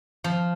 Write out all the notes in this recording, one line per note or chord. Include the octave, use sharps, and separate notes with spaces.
F3